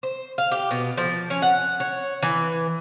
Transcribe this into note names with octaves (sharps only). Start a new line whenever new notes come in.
C5
F5
G4
B2
F3
C#4
F#5
C#5
E3